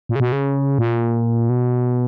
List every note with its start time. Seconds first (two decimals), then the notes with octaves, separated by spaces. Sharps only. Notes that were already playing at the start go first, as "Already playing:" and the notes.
0.09 A#2
0.16 C#3
0.20 B2
0.32 C#3
0.78 A#2
1.49 B2